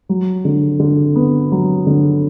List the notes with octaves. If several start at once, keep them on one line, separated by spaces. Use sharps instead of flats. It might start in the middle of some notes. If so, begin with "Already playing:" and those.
F#3
D3
D3
B3
F#3
D3